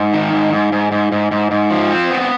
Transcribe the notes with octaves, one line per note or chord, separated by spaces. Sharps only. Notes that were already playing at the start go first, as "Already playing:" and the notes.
Already playing: G#2
D#3
G#2
G#2
G#2
G#2
G#2
G#2
G#2
F3
C4
B3